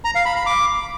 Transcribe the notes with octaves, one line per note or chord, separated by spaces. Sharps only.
A#5
F5
B5
B5
D6